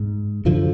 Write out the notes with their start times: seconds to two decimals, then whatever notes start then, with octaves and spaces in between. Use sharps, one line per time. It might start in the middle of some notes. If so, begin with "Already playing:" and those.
Already playing: G#2
0.45 F#2 D3 F3